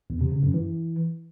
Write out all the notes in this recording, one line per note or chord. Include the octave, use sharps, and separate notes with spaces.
E2
C3
C#3
F#2
E3